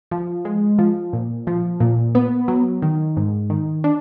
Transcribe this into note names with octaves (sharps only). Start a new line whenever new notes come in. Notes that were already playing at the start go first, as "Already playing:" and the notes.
F3
G#3
F3
A#2
F3
A#2
B3
F#3
D#3
G#2
D#3
D4